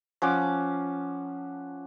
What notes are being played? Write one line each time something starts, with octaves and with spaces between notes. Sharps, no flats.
F3 C#4 F#5 D6